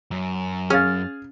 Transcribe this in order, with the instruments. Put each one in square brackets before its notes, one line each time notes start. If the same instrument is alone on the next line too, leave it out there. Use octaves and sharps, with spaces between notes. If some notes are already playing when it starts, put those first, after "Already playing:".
[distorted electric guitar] F#2
[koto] C#4 [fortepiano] G#4 F5 [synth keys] F6 A6